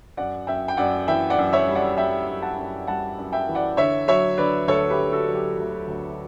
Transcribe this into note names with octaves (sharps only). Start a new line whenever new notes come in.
F#2 D5 F#5
F#2 E5 G5
G5
F#2 D5 F#5
E3 E5 G5
D5 F#5
F#2
C#5 E5
G3
D5 F#5
G3 E5 G5
F#2
F#5 A5
F#2
G3 F#5 A5
F#2
E5 G5
E3
D5 F#5
D3 C#5 E5
F#3 C#5 E5
D3 B4 D5
D2 A4 C#5
G4 B4
D2
F#4 A4
F#3
G4
D2
D2